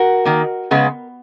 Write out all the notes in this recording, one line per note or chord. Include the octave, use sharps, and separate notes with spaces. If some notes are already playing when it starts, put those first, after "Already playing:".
Already playing: F#4 A#4
D#3 A#3
C#3 G#3 B3